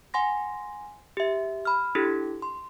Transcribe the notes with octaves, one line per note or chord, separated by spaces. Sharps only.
F#5 G#5 C6 A#6
G4 E5
B5 F6
D4 E4 G4 A4
C6